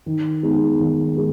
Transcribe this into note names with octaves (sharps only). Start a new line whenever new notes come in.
D#3
G#3 B3 D#4
D#3
G#3